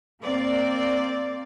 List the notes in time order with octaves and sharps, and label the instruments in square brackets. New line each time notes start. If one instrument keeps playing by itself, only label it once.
[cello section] A#3 C4 D5